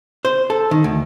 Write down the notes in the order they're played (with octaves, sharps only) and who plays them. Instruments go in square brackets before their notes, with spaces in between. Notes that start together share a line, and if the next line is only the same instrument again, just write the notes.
[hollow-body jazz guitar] C5
A4
D#3
D2